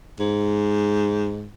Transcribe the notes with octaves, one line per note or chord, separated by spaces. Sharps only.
G#2